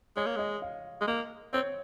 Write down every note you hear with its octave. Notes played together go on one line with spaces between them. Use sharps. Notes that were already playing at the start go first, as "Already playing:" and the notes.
G#3 C#5
A#3
G#3 D#5
F5
G#3
A#3 D#5
C4 C#5